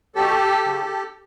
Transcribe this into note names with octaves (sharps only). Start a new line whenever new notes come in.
B2 F#3 G4 A4
C#3 F#3